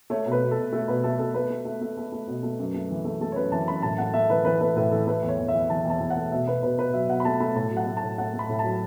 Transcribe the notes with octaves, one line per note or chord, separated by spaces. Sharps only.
A3 C#5
B2
B4
B2
A4
B2
A3 A4
B2 B4
A3 A4
B2 A4
A3 B4
A3
A3
A3
A3
A3
B2
A3
F#2
A3
E3
A3
A3 A4
C#5
F#2 B4
E3 A5
F#2 B5
A2 A5
A3 F#5
A3 E5
E3 B4
E3 B4
A3 B4
A2 B4
E3 A4
A3 B4
E2
C#5
E2
E5
E2
E3 A5
E2 A5
E2
F#5
A3
B2 E5
B2 B4
B2 B4
B2 B4
F#3 E5
B2 F#5
B5
A3 A5
A3 B5
A2 A5
F#3
F#5
A3
A5
A2
A3 F#5
A3
B5
A2
A5
F#3